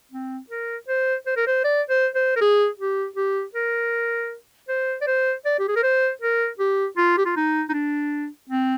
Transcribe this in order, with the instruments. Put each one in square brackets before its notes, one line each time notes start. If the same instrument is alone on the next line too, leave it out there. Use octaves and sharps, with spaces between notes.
[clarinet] C4
A#4
C5
C5
A#4
C5
D5
C5
C5
A#4
G#4
G4
G4
A#4
C5
D5
C5
D5
G4
G#4
A#4
C5
A#4
G4
F4
G4
F4
D#4
D#4
D4
C4